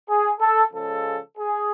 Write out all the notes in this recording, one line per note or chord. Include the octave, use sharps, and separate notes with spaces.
G#4
A4
C#3 F3 G#3 A4
G#4